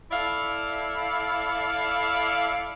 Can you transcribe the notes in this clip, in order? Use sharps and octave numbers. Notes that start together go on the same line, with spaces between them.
E4 A4 D5 E5 F5